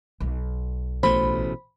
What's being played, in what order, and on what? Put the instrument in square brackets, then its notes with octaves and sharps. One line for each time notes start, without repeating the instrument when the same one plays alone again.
[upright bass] B1
[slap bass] A1 B2 A3 [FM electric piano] C5 B5